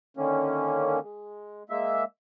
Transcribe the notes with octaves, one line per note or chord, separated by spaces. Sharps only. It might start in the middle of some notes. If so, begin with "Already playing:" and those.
D3 D#3 A#3 C#4
G#3
G#3 A#3 E5